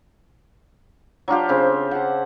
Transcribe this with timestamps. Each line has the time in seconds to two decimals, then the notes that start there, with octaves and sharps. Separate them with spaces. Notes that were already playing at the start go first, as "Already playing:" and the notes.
1.28 F#3 D4 F4 G4
1.49 C#3 C4
1.91 F#5 A5